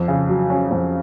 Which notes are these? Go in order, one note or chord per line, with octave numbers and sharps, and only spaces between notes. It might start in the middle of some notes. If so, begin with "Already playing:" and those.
Already playing: F2
C#3
F#3
C#4
F2